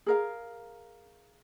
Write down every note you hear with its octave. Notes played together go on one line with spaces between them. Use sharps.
G#4 A#4 F5